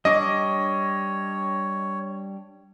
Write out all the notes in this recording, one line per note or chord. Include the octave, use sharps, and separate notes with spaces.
G3 D4 C#5 D#5 D6